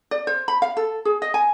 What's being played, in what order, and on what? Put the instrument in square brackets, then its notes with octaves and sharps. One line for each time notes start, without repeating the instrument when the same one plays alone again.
[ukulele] D5
C5
B5
F5
A4
G#4
D#5
G#5